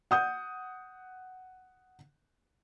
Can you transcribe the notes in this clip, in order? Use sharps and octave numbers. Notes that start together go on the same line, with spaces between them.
F#5 D#6 G6